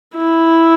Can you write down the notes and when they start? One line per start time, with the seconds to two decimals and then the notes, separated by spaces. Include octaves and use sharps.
0.16 E4